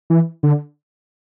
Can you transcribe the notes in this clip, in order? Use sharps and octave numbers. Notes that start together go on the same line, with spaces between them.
E3
D3